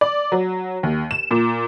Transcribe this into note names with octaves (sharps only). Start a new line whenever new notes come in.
D5
F#3
D#2
E7
A#2